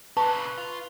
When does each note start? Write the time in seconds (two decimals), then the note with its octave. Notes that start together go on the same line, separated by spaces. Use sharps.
0.17 A#2 C#3 B4 A5
0.58 F4